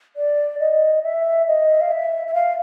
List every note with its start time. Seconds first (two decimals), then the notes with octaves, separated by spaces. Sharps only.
0.16 D5
0.60 D#5
1.04 E5
1.47 D#5
1.81 F5
1.91 E5
2.27 E5
2.34 F5